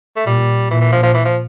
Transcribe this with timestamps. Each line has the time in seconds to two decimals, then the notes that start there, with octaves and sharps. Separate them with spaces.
0.16 A3
0.26 A#2 G3
0.70 A#2 E3
0.81 E3
0.92 F3
1.03 F3
1.14 E3
1.25 F3